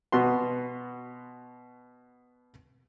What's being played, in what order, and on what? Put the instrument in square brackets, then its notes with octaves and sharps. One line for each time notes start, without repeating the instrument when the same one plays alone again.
[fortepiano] B2 B3 F#4 C6